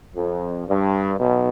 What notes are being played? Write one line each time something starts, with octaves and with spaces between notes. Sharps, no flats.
F2
G2
B1 B2